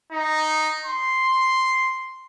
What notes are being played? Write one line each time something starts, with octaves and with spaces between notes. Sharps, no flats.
D#4
C6